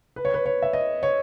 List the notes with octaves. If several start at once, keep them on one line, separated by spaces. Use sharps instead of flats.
B4
C#5
B4
C#5
E5
D#5
C#5